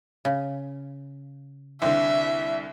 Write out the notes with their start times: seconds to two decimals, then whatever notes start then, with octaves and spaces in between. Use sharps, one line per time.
0.25 C#3
1.82 C2 D3 C4 E5